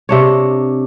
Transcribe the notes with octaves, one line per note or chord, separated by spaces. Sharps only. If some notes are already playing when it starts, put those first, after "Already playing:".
C3 D4 C#5